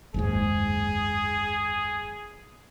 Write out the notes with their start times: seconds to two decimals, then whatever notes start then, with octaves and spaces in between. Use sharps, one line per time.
0.14 F#1 D#2 G#2 G#4